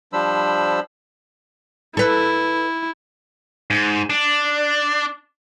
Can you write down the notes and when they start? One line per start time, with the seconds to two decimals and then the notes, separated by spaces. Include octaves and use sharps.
0.13 F3 G3 D4 C5 B5 E6
1.97 E4 A4 B4
3.70 G#2
4.10 D4